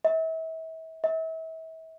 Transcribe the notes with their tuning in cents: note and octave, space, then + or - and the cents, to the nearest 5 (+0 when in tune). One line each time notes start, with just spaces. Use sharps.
E5 -35
E5 -35